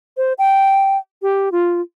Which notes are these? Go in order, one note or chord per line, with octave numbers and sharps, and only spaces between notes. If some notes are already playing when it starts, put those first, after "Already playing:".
C5
G5
G4
F4